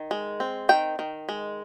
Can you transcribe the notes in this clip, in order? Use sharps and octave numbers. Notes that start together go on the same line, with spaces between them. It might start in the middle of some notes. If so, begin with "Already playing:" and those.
Already playing: D#3
G#3
C4
D#3 G5
D#3
G#3